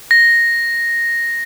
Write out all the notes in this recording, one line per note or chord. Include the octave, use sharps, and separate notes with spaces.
A#6